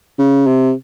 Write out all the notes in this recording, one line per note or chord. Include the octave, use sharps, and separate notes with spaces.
C#3
C3